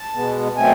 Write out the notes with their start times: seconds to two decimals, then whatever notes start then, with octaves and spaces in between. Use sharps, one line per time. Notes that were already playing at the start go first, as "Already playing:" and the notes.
Already playing: A5
0.13 B2 G#3 B3
0.57 B2 F#3 A3 C4 G#5